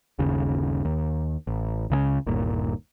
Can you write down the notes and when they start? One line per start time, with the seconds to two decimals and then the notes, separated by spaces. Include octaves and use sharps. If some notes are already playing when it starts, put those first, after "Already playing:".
0.19 G1 D#2 C#3
0.85 D#2
1.47 A1
1.90 C#2 C#3 F#3 C#4
2.26 G1 D#2 A#2